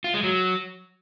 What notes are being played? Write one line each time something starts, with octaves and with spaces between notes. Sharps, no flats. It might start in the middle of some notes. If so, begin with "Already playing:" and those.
F4
G#3
F#3